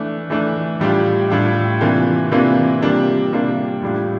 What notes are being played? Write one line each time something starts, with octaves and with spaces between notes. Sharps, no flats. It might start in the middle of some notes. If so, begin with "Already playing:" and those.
Already playing: E3 A3 D4
E3 A3 D4
A2 G3 D4 F4
A2 G3 D4 F4
C3 E3 A#3 D4 F4
C3 E3 A#3 D4 F4
C3 G3 A#3 D4 F4
C3 G3 A#3 D4 F4
A2 G3 D4 F4